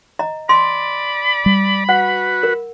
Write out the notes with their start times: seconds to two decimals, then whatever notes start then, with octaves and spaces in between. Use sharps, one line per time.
0.19 D#5 A#5
0.49 D5 B5 C6
1.46 G3
1.89 F#4 B4 F#5
2.43 A#4